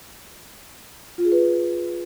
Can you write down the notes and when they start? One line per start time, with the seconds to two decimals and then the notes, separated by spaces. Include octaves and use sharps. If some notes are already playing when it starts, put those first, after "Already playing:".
1.18 F4
1.25 G#4
1.32 B4